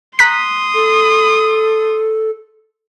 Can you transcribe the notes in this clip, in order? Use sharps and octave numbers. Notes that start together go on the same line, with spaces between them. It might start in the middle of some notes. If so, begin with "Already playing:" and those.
A#5 C6 D#6 F#6 B6
A4